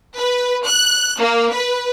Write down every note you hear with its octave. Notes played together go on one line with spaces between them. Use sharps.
B4
F#6
A#3
B4